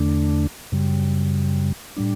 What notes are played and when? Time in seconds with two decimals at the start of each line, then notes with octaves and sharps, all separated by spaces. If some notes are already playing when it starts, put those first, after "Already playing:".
Already playing: E2 D3 A3 D4
0.72 F#2 C#3 G3
1.97 A2 G3 D4